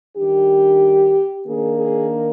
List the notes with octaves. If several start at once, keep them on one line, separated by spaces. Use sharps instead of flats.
D#3 G3 D4 G4
D#3 A#3 D4 G#4
G#4